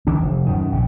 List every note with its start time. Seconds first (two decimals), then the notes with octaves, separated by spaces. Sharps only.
0.07 D#3 E3 D4
0.22 F1
0.46 F#2 B2 D#3
0.72 A#1 C#3